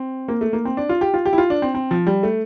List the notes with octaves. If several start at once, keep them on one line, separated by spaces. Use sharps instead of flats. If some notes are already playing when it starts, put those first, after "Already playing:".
Already playing: C4
A#3
A3
A#3
C4
D4
F4
G4
F4
G4
E4
F4
D4
C4
C4
F3
G3
A3